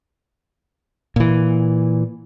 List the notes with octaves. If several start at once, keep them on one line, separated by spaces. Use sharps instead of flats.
A#2 E3